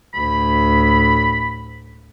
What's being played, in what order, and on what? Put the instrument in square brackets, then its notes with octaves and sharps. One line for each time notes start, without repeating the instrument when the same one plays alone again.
[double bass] D2 A2 [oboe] B5